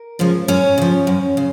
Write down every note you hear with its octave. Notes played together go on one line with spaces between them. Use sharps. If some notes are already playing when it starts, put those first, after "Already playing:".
Already playing: A#4
C#3 F3 G#3
F#2 C#4 C#5
C#3 F3
F#2
C#3